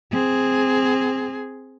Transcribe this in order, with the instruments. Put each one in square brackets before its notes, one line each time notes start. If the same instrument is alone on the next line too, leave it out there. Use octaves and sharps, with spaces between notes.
[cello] C4 G#4